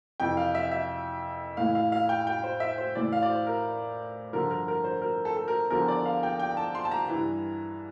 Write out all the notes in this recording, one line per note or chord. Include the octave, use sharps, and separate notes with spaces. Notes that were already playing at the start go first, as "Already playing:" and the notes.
F2 C3 E3 G5
F5
E5
E5
A2 E3 F5
F5
F5
G5
G5
C5
E5
C5
A2 E3 D5
F5
D5
C5
A#4
G2 D3 F3 A#4
A#4
A#4
C5
A#4
A4
A4
A#4
E2 D3 F3 A#4
D5
F5
G5
G5
A5
C6
A5
A#5
E3
G2